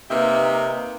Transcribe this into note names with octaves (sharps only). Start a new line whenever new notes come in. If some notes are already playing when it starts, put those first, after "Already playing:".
C3 A#3 D#4 G4 B4 E5